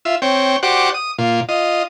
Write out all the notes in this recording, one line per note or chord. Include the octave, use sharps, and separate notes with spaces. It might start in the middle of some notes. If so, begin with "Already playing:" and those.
F4 E5
C4 C#5 G5
F#4 G4 C5 D5 F#5
D#6
A#2 F4
F4 D#5